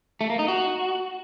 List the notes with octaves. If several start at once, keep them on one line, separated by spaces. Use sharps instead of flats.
A3
A#3
D#4
F#4